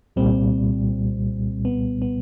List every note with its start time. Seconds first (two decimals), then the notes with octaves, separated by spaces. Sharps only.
0.16 C2 A#2 G3 C4
1.65 B3
2.02 B3